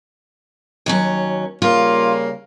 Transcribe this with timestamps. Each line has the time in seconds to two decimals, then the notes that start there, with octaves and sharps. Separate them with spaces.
0.86 D#2 F#3 C#4
1.62 C#3 G3 A#3 F4